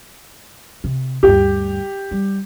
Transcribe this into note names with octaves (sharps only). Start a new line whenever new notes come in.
C3
D2 G2 G4
G3